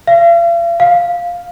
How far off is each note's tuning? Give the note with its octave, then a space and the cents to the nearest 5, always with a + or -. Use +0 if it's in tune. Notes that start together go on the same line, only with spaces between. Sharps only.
F5 -45
F5 +0